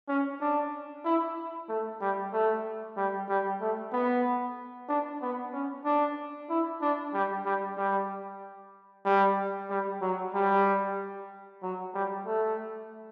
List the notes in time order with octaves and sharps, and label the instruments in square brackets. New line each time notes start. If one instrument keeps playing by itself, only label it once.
[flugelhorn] C#4
D4
E4
A3
G3
A3
G3
G3
A3
B3
D4
B3
C#4
D4
E4
D4
G3
G3
G3
G3
G3
F#3
G3
F#3
G3
A3